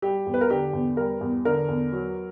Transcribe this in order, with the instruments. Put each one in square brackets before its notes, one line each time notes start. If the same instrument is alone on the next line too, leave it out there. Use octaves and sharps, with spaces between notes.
[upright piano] G3 G4
E2
B4
A#4
D3 G4
E2
G3 A#4
E2
D3 A#4
E2
F#3